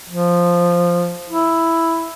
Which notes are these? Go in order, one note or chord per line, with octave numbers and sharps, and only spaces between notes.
F3
E4